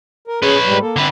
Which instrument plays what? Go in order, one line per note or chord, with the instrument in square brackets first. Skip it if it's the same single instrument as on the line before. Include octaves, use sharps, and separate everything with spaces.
[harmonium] A#4
[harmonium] C#4 G#4 [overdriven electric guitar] B4 C#5
[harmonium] G#2 G3
A#3 A4
[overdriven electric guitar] D3 B4 [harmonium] C4